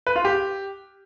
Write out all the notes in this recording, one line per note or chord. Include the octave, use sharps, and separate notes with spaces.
B4
F4
G4